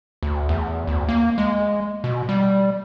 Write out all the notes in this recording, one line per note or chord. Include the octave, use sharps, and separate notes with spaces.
D2
E2
D2
A#3
G#3
B2
G3